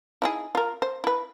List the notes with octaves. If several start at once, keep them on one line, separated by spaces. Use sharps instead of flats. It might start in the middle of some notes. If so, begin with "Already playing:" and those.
D#4 E4 G#4
F4 A#4
C5
E4 B4